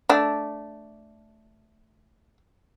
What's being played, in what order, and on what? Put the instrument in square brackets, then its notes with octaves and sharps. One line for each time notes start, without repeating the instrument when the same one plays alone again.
[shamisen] A3 D4